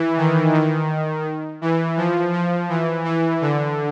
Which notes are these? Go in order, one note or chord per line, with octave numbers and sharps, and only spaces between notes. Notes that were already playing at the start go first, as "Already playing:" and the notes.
Already playing: E3
D#3
D#3
E3
F3
F3
E3
E3
D3